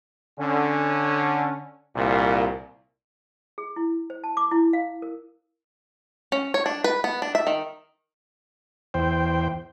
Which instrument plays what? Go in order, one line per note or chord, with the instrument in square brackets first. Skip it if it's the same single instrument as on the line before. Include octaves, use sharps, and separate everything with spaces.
[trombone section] D3 C#4
C2 A#2
[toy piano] G#4
E4
C5
A5
D6
E4
F5
A#4
[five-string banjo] C#4
C#5
D4
B4
B3
D4
E5
D#3
[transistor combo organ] E2 C5 G5